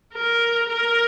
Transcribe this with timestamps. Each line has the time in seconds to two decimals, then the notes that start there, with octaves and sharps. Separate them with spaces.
0.14 A#4
0.69 A#4